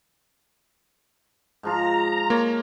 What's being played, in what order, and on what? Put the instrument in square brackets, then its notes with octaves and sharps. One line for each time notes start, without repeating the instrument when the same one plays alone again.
[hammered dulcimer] G#2 F3 F4 [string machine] A#5
[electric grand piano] A#3 [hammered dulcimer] C#5